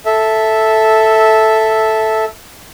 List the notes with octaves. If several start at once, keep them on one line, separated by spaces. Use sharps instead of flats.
A4 E5